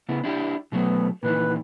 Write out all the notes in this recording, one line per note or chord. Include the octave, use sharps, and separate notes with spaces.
C#3 B3 E4
D4 E4 G4
B2 F#3 A3 B3
A#2 D#3 E3 B4